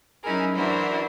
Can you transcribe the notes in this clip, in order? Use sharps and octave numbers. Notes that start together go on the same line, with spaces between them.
F#3 C#4 D#4 E4 G#4 A#4
E3 D4 E4 F#4 A#4 C5